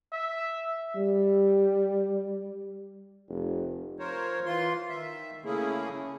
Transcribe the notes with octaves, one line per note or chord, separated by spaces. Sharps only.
E5
G3
F1
F3 A#4 C5 C#5
E3 F4 C6
D#3 E5
C#3 A3 A#3 C#4 E4 G#4